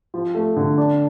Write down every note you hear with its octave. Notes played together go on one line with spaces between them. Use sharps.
F3
A3
D3
D4